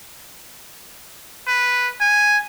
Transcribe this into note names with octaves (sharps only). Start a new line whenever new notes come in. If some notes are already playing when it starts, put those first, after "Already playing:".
B4
G#5